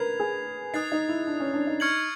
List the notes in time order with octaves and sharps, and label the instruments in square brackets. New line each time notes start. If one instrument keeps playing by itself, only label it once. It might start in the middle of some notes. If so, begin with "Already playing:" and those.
Already playing: [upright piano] A#4 B4 [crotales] G#6 C7 F7
[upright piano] G#4
[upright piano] D#4 [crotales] D#6 F#6 A6 C7
[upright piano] D#4
E4
D4
C#4
D4
D#4
[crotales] C#6 F6 G#6 C#7 F#7